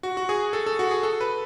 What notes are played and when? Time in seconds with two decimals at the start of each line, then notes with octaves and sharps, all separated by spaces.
0.03 F#4
0.17 F#4
0.29 G#4
0.53 A4
0.66 A4
0.79 F#4
0.91 G#4
1.03 A4
1.21 B4